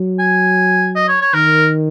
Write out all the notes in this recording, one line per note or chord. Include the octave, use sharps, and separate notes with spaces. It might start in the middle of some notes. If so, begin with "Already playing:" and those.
Already playing: F#3
G#5
D#5
C#5
C#5
D#3 A#4